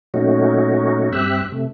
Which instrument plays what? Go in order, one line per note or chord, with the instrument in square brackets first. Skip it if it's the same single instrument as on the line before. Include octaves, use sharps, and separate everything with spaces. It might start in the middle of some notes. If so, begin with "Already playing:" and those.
[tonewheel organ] A#2 F#3 A3 C#4 D#4 F#4
G2 C4 G4 E5 E6 F#6
C3 A3